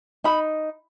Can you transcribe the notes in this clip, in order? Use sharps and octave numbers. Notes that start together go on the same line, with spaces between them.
D#4 B5